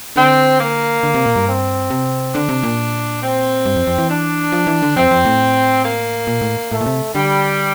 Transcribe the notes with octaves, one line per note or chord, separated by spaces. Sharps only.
D3 C4
A#3
D3
C3
A#2
G2
C4
C3
D3 D4
C3
A#2
C4
G2
F2
F2
E3
D4
F3
E3
D3
F2 C4
F2
A2
A#3
A#2
A2
A2 A3
A#2
C3
D3 G3